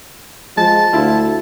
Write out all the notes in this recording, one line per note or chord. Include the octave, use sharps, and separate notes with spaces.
F3 G#3 A5
D2 E4 F4